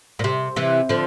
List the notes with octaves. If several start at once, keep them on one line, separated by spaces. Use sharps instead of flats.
A#2
C3
C3 E3
D3 F3